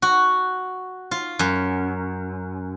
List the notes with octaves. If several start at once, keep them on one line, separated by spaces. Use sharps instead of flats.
F#4
F4
F#2